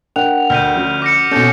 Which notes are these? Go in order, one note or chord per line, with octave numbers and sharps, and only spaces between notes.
D4 A#4 F#5 G5 F7
D2 F6 G6 D#7
F3 C#4 F#4
D6 A#6 C#7
B2 C4 C#4 A4 G6